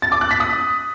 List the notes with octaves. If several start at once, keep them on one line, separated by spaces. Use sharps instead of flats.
A6
D6
F#6
B6
D#6